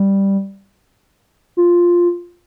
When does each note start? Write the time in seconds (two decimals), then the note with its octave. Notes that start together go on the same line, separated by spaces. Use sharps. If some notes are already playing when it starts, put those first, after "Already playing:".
Already playing: G3
1.57 F4